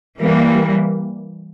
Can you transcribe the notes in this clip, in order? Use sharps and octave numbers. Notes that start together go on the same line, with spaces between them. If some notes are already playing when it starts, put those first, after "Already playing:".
E3 G3 A#3